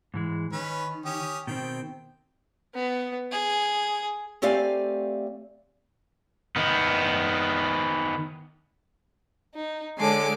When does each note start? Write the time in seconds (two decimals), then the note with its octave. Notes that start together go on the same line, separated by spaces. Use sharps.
0.14 G#2 E3 G#3
0.52 D#3 C#4 B4
1.05 C#4 G4 D#6
1.47 B2 D#3 C4 G5
2.74 B3
3.32 G#4
4.42 A3 C4 G4 D5 F5 G#5
6.56 D#3 B3
9.55 D#4
9.99 D3 G#3 C#5 G#5 A5 D6 C7